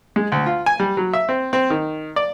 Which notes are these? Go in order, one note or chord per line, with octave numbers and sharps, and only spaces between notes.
G#3
D2
F4
G#5
G3
F#3
E5
C4
C4
D#3
D5